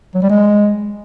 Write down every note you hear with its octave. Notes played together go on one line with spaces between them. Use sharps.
F#3
G3
G#3